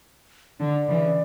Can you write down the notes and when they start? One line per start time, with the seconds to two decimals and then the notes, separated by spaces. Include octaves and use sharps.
0.60 D3 D5
0.88 C#3 E3